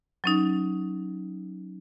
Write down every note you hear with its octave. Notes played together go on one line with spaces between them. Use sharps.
F#3 C#4 D#4